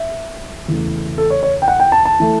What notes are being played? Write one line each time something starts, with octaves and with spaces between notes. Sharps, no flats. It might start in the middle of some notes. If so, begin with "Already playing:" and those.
Already playing: E5
E2 C#3 E3 A3
A4
C#5
C#5
G5
F#5
G5
A5
A5
E3 A3